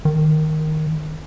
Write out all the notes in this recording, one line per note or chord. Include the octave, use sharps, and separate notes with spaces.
D#3